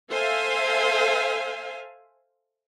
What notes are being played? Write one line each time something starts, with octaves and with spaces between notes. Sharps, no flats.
A4 C5 E5 F5 G#5